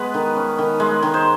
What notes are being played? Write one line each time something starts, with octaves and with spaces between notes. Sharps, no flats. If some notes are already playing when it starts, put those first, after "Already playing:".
Already playing: G#3 B3 B4
D#3
C#4
D#3
G#3
D#3
C5